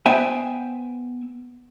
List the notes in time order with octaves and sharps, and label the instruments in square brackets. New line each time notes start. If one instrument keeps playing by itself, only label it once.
[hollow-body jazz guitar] B3 C5 E5 G5 G#5